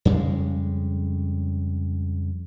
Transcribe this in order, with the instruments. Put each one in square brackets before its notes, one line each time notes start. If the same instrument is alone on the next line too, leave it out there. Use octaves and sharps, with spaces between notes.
[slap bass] F2 C#3 G3 G#3